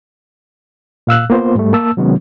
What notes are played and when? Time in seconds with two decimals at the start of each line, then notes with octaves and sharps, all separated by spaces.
1.07 A#2 F5 E6 F#6
1.30 A#3 B3 F4 C5
1.55 G#2 G3 A3
1.73 A#3 A5 E6
1.97 C3 D#3 F#3 G#3 B3 C#4